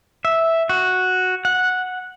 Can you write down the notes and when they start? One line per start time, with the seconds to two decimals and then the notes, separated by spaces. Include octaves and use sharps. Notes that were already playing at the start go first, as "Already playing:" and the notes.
0.25 E5
0.69 F#4
1.45 F#5